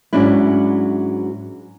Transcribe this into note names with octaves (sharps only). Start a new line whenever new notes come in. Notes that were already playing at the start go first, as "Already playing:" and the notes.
G#2 F#3 C#4 D4 E4